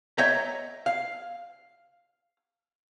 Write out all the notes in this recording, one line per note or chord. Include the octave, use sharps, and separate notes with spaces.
C#5 D#5 E5 G5 A#5
F5